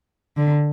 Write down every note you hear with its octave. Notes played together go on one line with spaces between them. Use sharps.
D3